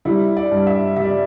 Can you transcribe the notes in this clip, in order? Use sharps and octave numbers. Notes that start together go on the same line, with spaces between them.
G3 E4
D5
G2
E5
G3 E5
D5